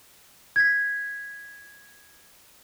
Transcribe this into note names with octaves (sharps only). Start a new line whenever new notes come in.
G#6 B6